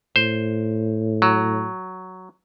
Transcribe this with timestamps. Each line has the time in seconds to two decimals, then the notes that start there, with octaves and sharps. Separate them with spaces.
0.16 A2 C5
1.22 F#3